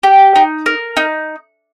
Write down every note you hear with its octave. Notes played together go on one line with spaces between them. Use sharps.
G4
D#4
A#4
D#4